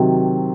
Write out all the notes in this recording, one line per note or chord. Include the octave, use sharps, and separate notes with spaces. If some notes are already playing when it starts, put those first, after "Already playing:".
Already playing: C3 D#3 F#3